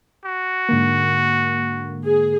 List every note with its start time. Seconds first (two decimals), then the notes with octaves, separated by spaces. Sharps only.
0.25 F#4
0.69 G#2 D3 A#3
2.05 G#4